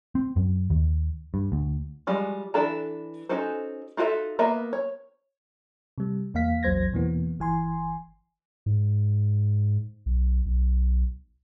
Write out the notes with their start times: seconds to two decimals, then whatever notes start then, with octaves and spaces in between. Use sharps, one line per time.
0.15 C4
0.36 F#2
0.70 D#2
1.34 G2
1.52 D2
2.07 F3 G3 G#3 F#4
2.54 E3 D4 A4 A#5
3.29 C#4 D#4 F#4 A4 C5
3.97 D#4 F4 F#4 A4 E5
4.39 A#3 B3 E5 A#5
4.73 C#5
5.98 C3 G3
6.34 E2 A#3 F5 B6
6.63 A#1 E2 F#3 C5 G#6 A#6
6.93 E2 B2 E3 A#3 B3
7.39 G1 E3 G#5 C6
8.66 G#2
10.06 B1
10.46 B1